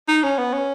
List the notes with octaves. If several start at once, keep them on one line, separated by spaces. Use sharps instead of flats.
D#4
C#4
B3
C#4